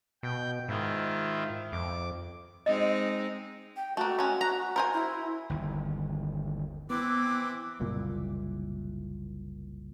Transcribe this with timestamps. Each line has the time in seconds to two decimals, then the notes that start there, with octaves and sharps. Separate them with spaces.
0.23 B2 G5
0.68 G#2 D#3 E4 F4
1.72 F2 D6
2.66 G#3 C4 D#4 D#5
3.76 G5
3.97 A3 A#3 F#4
4.19 G#3 C#4
4.41 A#5
4.76 A#4 C5 G#5
4.94 E4
5.49 G1 D#2
6.90 E3 B3 C4 D6
7.80 F#1 C2 A#2